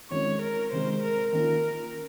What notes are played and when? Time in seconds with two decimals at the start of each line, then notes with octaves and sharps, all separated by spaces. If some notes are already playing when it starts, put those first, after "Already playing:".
0.10 F2 D#3 G#3 C#4 C#5
0.41 A#4
0.71 C3 D#3 G#3 C5
1.03 A#4
1.33 D#3 A#3 C#4 F4 A#4